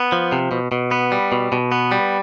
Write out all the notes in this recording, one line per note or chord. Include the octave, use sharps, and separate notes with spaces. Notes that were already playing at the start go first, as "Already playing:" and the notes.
Already playing: B3
F3
C3
B2
B2
B3
G3
B2
B2
B3
G3